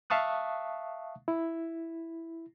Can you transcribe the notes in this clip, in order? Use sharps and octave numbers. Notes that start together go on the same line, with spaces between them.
E5 F5 A5 C#6 D#6 F#6
E4